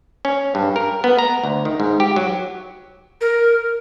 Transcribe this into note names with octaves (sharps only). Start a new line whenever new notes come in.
C#4
G2
A#4
B3
A#5
D2
D#3
G#2
G4
F#3
A#4